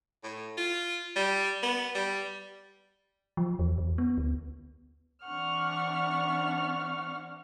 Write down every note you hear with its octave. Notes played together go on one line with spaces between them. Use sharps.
A2
F4
G3
B3
G3
F3
E2
E2
B3
D2
E3 C4 D4 F#5 C#6 F6